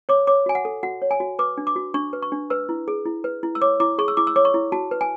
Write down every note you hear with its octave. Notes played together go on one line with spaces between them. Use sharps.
C#5 D6
C#5 D6
F#4 G#5
F#5
A4
F#4 F#5
C#5
G#5
F#4
B4 D6
D4
D6
F#4
D4 C#6
B4
C#6
D4
B4 E6
E4
G#4
E4
B4
E4
E6
C#5 D6
E4 D6
G#4 C#6
E6
E4 D6
E6
C#5 D6
C#6
E4
F#4 A5
B4
G#5